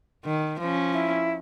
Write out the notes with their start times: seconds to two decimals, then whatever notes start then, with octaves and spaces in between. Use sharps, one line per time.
0.25 D#3
0.60 F3 C#4
0.93 E4